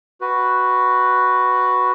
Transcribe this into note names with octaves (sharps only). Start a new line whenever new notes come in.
F#4 B4